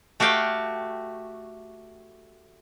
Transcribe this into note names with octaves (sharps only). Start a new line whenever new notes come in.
A3 F#4 G4 F5 G5